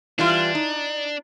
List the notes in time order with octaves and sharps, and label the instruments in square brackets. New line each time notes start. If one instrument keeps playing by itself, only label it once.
[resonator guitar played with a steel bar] E3 G3 F4 [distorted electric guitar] D4
[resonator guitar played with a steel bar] D#4